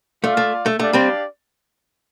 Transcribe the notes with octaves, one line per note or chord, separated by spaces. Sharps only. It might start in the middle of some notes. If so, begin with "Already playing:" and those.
A3 F4 D5 F5
A3
A3
A3 D4 G4 D5 F5
G3 C4